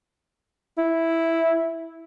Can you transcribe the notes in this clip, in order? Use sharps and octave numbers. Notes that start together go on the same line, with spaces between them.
E4